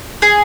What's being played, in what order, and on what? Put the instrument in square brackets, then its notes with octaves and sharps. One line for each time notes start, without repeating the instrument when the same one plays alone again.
[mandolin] G#4